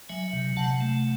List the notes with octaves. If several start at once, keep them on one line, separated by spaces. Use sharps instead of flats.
F#3 E5 G#5
C3
C3 F#5 A5
A3